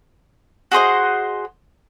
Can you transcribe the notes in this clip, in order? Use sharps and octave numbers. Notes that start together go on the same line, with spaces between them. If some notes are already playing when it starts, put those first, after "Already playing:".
F#4 G#4 C5 D#5